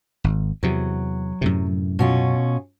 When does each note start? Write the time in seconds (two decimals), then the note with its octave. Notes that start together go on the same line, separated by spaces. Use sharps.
0.24 G#1
0.63 E2 C3 F#3
1.41 F#2 A2 C3
1.99 B2 C#4 F4